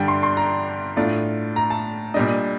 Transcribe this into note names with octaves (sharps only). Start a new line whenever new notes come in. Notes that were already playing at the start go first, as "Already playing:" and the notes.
Already playing: G2 D3 G3 D4 G5
C6
C6
A#5
A2 A3 D4 F4
A#5
A5
A#2 G3 D4 D#5